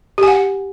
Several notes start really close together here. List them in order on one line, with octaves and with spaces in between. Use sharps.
G4 G#5 F#5